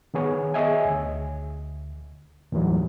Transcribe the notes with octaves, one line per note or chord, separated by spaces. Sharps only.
D#3 B3 G#4 C#5
G#4 C#5 D#5 E5 G#5
D2
D#2 A2 D#3 E3 F#3 G3